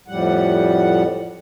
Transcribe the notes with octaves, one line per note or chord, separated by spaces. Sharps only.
F2 A2 G3 F#5